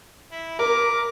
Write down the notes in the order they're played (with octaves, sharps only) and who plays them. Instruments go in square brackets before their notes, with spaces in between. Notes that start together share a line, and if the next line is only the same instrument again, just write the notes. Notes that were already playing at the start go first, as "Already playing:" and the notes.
[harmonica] E4
[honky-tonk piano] A#4 [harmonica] D6